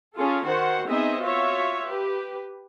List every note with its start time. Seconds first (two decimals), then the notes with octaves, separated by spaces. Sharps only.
0.15 C#4 F4 G#4 A4
0.45 D#3 F#4 C5 F#5
0.87 B3 C4 D#4 G#4 D#5 E5
1.21 F4 F#4 C#5 E5
1.86 G4 B4